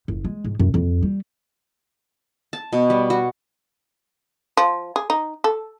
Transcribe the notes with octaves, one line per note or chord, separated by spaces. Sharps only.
F#1
G#3
G#2
F#2
F2
G3
A5
B2
G3
F#4
F3
G#4
D#4
A4